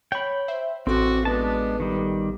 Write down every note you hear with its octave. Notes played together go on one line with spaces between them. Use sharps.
C#5 G5 B5
C5 E5
A1 C4 F#4 A4 D6
G#3 B3 D4 A5
D#3 G3